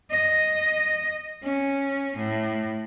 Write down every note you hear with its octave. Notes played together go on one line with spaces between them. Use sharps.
D#5
C#4
A2